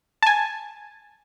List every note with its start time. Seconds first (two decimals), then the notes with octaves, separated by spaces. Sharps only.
0.23 G#5 A5